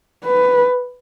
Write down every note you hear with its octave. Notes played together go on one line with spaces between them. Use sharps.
B4